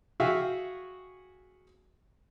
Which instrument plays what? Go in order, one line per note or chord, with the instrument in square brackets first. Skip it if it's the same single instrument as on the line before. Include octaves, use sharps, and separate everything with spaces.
[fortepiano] F#4 G#4 E5 F5 G5